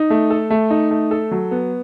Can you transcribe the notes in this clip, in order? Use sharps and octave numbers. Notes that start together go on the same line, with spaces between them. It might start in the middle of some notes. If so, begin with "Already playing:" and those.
Already playing: D#4
A3
A4
A3
D#4
A3
A4
F#3
B3